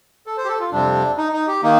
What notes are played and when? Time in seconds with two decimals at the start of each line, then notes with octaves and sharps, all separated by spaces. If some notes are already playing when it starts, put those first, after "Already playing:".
0.26 A4
0.37 C5
0.44 G4
0.48 A4
0.60 F4
0.71 F2 C3 G3 C4 D4
1.17 D#4
1.32 D#4
1.47 G4
1.63 D#3 A#3 D#4